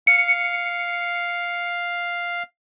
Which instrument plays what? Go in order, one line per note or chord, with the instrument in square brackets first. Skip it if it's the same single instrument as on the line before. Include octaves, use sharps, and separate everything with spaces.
[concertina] F5 [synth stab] C#7